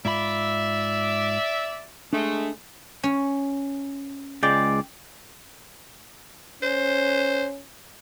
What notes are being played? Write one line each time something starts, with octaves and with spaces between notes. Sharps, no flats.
G#2 F4 D5 E5 B5
G#3 A3 D4
C#4
C#2 G#3 D5 G5
C#4 C5